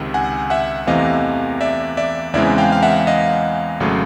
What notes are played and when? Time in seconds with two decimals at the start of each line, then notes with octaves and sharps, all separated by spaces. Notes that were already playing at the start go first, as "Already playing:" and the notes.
Already playing: C#2 C3 D#3
0.14 F#5 G#5
0.50 E5 F#5
0.87 E2 C3 E3 A3 C4 D#5 F5
1.61 D5 E5
1.97 D5 E5
2.33 E2 C#3 E3 G#3 C4 D5 E5
2.58 F5 G5
2.72 F5
2.82 E5 F#5
3.07 D#5 F5
3.80 G#1 C#3 F#3 A3